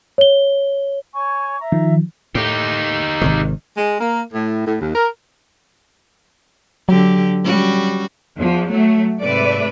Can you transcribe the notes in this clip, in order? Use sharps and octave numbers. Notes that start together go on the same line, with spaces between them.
C#5 G7
C#5 G#5 C#6
E5 A#5
D#3 F3
A2 D#4 G4
G#1 C3 D#3
G#3
A#3
A2
A2
D#2
A#4
D3 F#3 G4
G3 C#4 F#4
E2 F3
F#3 A3
G#2 C3 A3 B4 D5 E5